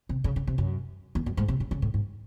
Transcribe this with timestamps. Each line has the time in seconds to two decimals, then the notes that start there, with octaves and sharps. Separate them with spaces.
0.09 C3
0.24 C#3
0.36 C#3
0.47 C3
0.58 F#2
1.15 E2
1.26 F#2
1.37 G#2
1.48 C3
1.60 C#3
1.71 C#3
1.82 A2
1.94 G#2